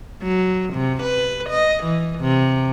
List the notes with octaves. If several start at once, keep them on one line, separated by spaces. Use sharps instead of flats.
F#3
C3
B4
D#5
E3
C3